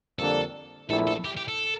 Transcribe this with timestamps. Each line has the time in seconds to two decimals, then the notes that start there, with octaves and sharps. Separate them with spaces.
0.18 F2 D3 G3 A#3 D4 A4
0.89 A#1 A#2 A3 E4 A4
1.07 A4
1.25 G4
1.37 G4
1.48 A4